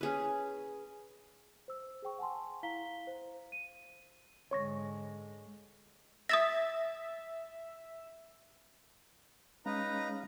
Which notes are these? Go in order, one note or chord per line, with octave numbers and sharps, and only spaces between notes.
C#4 G#4 B4
C5 E6
G#4 C5 G5 C#6
F#5 G#5 A5 C6
E4 F5 A#5 B6 G7
C5
D#7
G#2 D3 G#3 C#5 C#6 A#6
E5 D#6 A6 A#6
G#3 C#4 D#4 B4 F5 A#5